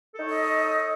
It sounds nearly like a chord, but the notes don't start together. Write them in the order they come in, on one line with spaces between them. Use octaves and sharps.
A4 D#4 C#5 D#5